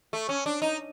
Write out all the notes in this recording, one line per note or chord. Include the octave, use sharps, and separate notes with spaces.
A3
C#4
D4
D#4